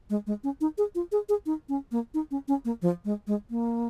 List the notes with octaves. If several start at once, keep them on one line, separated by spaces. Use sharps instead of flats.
G#3
G#3
C#4
D#4
G#4
F4
G#4
G#4
D#4
C#4
A#3
D#4
C#4
C#4
A#3
F3
G#3
G#3
A#3